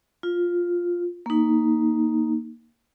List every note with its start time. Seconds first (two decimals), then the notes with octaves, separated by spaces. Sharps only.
0.23 F4
1.26 A#3 D#4